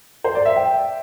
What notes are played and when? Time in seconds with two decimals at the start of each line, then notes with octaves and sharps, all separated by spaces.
0.24 C5
0.35 D5
0.45 E5
0.56 G5